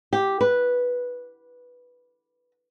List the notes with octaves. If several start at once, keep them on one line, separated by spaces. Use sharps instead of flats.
G4
B4